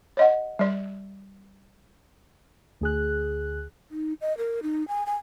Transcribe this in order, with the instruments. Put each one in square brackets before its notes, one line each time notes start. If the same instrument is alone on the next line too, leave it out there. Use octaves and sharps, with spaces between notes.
[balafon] C#5 D#5 F#5
G3 D5
[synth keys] D2 G#4 F#6
[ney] D#4
D#5
A#4
D#4
G#5
G#5